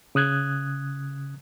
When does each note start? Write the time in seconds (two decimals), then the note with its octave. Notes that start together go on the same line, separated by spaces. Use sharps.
0.15 C#3 D#6 F#6 G#6